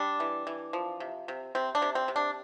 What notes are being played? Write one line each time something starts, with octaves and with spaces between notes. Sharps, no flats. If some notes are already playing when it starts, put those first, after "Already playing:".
Already playing: G3 D4
E3
E3
F3
C3
C3
C3 C4
D4
C3
C4
C3
D4